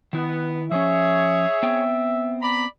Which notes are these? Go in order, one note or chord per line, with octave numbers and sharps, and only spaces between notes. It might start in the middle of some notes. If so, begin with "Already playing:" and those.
D#3 B3 E4
F3 C#4 G#4 C#5 E5
B3 C4 G5
D5 A#5 B5